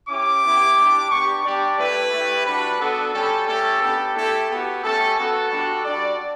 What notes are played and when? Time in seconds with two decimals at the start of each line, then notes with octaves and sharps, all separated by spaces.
0.09 C#4 E4 G4 D6
0.43 B3 E4 G4
0.77 G3 D4 G4
1.10 B3 D4 G4 C#6
1.45 G3 D4 G4 D5
1.79 A3 E4 G4 B4
2.12 A3 E4 G4
2.46 G3 D4 F#4 B4
2.80 B3 D4 F#4 A4
3.14 G3 C#4 G4 A4
3.47 A3 C#4 G4 A4
3.81 B3 D4 G4 A4
4.15 A3 E4 G4 A4
4.50 B3 F#4 G4
4.83 A3 C#4 G4 A4
5.17 B3 F#4 A4
5.51 G3 D4 F#4
5.85 G3 D4 F#4 D5